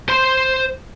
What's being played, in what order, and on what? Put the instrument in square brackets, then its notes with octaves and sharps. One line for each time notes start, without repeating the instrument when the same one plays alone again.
[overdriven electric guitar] C5 C6